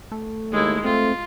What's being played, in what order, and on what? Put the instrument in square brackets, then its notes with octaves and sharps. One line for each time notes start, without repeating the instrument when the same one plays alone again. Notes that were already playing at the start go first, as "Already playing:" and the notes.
[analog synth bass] A3
[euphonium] D#2 [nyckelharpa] G#3 E4
[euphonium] A3 [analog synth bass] C4 [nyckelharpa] F4